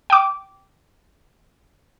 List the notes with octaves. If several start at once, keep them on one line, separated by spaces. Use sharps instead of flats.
G5 D6